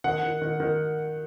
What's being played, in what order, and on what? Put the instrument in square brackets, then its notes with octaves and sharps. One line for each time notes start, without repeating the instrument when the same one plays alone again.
[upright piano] D#3 F#5
D#3
D#3
D#3